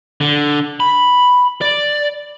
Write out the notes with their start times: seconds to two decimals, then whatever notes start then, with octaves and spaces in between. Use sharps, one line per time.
0.21 D3
0.80 B5
1.61 D5